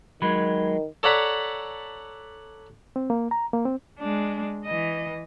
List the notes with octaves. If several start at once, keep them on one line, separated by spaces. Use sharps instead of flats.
D#3 F#3 G#3 B5 G#6
A4 C#5 D5 F#5 A#5 B5
C4
A#3
A#5
A#3
C4
G#3 D4
E3 D#5